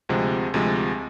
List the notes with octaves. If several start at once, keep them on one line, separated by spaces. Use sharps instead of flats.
D2 C3 F3 G#3
D2 C3 F3 G#3